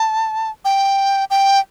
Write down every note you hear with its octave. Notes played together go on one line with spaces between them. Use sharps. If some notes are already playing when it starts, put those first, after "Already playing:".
Already playing: A5
G5
G5